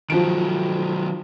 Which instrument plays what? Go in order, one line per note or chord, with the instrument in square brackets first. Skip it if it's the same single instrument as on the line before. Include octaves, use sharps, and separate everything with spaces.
[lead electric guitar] D#3 F#3 [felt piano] F3 D7